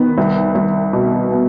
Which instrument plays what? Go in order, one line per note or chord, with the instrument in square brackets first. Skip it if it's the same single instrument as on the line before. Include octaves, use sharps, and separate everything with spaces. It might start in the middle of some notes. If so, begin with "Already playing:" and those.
Already playing: [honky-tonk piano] D#3 B3
C2
C2
B2
B3